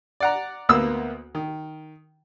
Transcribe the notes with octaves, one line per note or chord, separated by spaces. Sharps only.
D5 F#5 A#5
D2 A#3 B3 E6
D#3